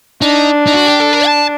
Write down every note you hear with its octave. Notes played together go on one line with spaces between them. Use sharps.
D4 D#4
D#4
F#4
G4
A4
A#4
A5